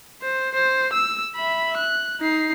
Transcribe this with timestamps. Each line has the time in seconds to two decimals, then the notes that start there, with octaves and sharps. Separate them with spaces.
0.22 C5
0.55 C5
0.93 E6
1.36 E5 B5
1.77 F#6
2.21 D#4 C7